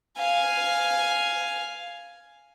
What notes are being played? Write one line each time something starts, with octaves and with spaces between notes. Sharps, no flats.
F5 G#5